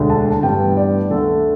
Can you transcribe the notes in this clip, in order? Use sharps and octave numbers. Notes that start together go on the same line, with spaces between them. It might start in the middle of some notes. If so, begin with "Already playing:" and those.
Already playing: E1 D2 D3
A5
A5
A1 G2 G3 B3 G5
D5
D2 D3 A3 A4